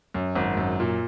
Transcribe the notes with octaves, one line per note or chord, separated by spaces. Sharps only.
F#2
G#1
F#2
A#2